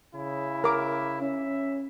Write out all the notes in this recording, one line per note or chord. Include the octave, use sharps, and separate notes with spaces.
C#3 E4
A#4 D6
C#4 E5